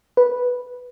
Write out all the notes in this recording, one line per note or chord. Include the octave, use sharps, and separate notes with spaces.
B4